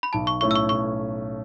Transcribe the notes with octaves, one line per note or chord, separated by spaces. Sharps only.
B5
B1 A5
C#6
A2 A3 C#4 E4 C#6
E6
C#6
B1 C#6